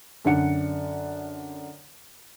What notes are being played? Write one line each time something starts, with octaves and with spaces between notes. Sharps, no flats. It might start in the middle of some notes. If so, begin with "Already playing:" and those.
F#2 D3 D4 F#5 C#7